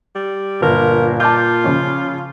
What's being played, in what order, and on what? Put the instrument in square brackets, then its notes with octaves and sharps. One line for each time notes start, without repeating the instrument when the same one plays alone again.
[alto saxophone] G3
[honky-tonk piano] G1 [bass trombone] A#2 [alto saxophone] A#4
[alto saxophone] F4 [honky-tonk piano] A5 D6 G6
[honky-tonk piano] C#3 F3 C#4